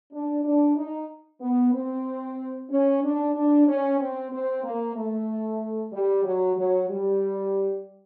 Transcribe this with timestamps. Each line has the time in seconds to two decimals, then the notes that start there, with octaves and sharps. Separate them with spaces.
0.12 D4
0.44 D4
0.76 D#4
1.41 B3
1.73 C4
2.70 C#4
3.03 D4
3.35 D4
3.67 C#4
3.99 C4
4.32 C4
4.64 A#3
4.96 A3
5.93 G3
6.25 F#3
6.57 F#3
6.89 G3